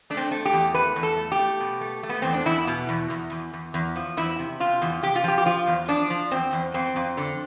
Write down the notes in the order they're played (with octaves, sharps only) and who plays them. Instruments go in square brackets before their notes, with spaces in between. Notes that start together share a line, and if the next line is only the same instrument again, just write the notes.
[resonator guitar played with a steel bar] A3 D4
C4
A3
G4
E2
A3 B4
E2
A4
A3
G4
A3
B2
A3
A3
B3
E2 C4
D4
E2 E4
B2
E2
E2
E2
E2
E2
F3
E2 E4
C3
C3 F4
E2
C3 G4
F4
F3 G4
G4
F3 F4
E2
F3 D4
F3
E2 C4
E2
F2 C4
F2
D3